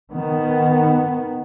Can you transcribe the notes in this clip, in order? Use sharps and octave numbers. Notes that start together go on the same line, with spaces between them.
D#3 B3